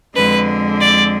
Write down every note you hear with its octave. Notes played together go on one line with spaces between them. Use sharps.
F2 D3 G#3 B4
D5